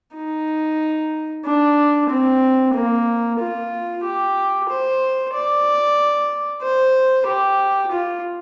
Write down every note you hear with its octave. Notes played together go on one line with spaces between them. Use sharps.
D#4
D4
C4
A#3
F4
G4
C5
D5
C5
G4
F4